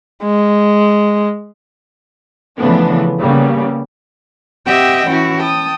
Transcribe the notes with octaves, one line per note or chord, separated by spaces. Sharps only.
G#3
C#3 E3 F3 A3 B3 D4
C#3 G3 A#3 B3
C4 G4 D#5 E5 F#5 G5
E3 C#4 E4 F#4
G5 A5 D#6